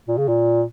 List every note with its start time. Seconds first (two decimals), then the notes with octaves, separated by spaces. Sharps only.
0.08 A#2
0.18 C#3
0.28 A#2